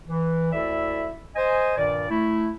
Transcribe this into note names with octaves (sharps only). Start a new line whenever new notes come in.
E3
D2 E4 A4 D5 E5
C5 D#5 G#5
G2 A#2 D#3 D5
A3 E4